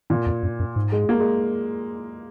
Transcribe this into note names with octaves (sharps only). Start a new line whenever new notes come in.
A#2 D#3
F2
F#2
F#2
G#2
G#3
A#3
G#3